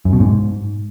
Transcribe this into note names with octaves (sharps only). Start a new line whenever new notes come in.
F#2
B2
G#2